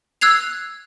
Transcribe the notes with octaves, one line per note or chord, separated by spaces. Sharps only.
E6 F#6 G#6 C7 F7